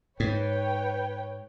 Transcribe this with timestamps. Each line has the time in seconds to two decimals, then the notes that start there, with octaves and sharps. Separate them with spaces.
0.20 G#2 B4 C#5 G5